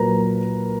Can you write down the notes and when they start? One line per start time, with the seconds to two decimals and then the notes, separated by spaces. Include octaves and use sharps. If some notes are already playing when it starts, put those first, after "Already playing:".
Already playing: A#2 F#3 A#4 B4 A#5